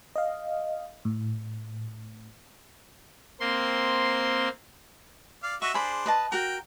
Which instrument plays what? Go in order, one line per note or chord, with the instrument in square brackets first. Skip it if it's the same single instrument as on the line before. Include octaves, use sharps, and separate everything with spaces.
[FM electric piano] D#5 F5
A2
[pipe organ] A#3 C4 C6
[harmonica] D5 F5
[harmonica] F#4 D#5 E5 [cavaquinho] C#6
[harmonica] D4 C5 [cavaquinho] G#4 B5
[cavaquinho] B4 D#5 A5
[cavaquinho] F#4 A#4 [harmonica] G5